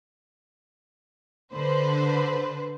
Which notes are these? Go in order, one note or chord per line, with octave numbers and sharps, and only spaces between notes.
D3 B4 C5